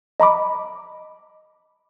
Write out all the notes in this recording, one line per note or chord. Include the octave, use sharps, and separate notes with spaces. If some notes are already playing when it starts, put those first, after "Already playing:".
D#5 A#5 B5 D6